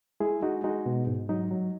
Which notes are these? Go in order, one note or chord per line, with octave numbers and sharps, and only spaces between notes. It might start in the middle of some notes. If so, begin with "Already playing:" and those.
G#3 E4 G#4
G#3 D#4 F#4
G#3 D#4 F#4
B2
G#2
F#3 D#4
F#3